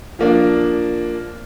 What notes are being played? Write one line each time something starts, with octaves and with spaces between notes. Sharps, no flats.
F3 A#3 D4